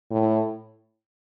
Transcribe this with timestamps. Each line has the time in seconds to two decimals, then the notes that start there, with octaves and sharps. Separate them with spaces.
0.11 A2